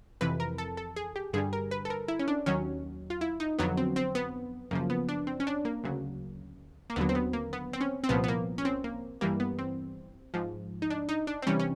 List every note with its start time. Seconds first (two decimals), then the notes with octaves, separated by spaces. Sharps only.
0.21 F2 C3 E3 B4
0.40 A#4
0.58 A4
0.77 A4
0.96 G#4
1.16 G4
1.33 G2 D3 G3 G#4
1.53 A#4
1.71 B4
1.85 A4
1.90 A#4
2.08 E4
2.19 C#4
2.28 D4
2.46 D#2 D#3 F#3 C#4
3.10 F4
3.21 E4
3.40 D#4
3.59 F2 D3 F#3 B3
3.77 C4
3.96 C4
4.15 B3
4.71 F#2 C#3 F3 A#3
4.90 B3
5.08 D4
5.27 C4
5.40 C#4
5.47 D4
5.65 A#3
5.84 D2 C#3 F#3
6.90 A#3
6.96 D#2 D3 F#3 B3
7.09 C4
7.15 B3
7.33 A#3
7.53 B3
7.73 C4
7.81 C#4
8.04 C4
8.09 C2 A#2 F3 B3
8.24 B3
8.28 A#3
8.58 C#4
8.65 C4
8.84 A#3
9.21 G2 E3 G3 A#3
9.40 B3
9.59 C4
10.34 G#2 F3
10.82 D#4
10.90 D4
11.09 D#4
11.27 D4
11.42 C4
11.47 C3 E3 G3 C#4
11.59 C#4